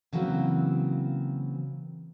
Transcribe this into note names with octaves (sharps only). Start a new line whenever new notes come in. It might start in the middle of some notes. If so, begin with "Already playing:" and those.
C#3 E3 F#3 A#3 C4